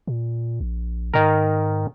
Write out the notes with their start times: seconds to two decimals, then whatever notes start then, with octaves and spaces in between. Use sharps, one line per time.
0.07 A#2
0.61 A#1
1.14 G#2 D#3 A#4